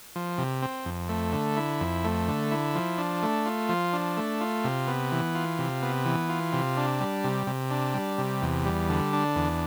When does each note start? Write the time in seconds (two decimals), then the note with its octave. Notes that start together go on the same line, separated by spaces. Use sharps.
0.16 F3
0.38 C3
0.62 C4
0.85 F2
1.09 A3
1.33 D3
1.57 E4
1.81 F2
2.04 A3
2.28 D3
2.51 E4
2.75 F3
2.98 D4
3.23 A3
3.46 F4
3.69 F3
3.93 D4
4.17 A3
4.41 F4
4.64 C3
4.88 B3
5.12 E3
5.35 F4
5.59 C3
5.83 B3
6.05 E3
6.29 F4
6.53 C3
6.77 D4
7.00 G3
7.24 C3
7.47 C3
7.71 D4
7.94 G3
8.18 C3
8.42 E2
8.65 G3
8.89 D3
9.13 D4
9.36 E2